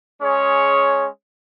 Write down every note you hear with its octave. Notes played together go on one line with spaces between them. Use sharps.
G#3 C#4 G#4 C#5